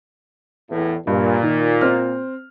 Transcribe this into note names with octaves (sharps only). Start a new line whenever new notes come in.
E2 A2
G2 A#2
D#3
C4 F6